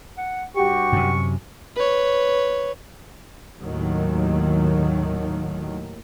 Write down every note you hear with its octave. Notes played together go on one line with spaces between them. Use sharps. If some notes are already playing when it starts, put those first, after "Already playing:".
F#5
G2 F#4 G4 C#6
F#2 C3
B4 C#5
D#2 A2 D#3 F#3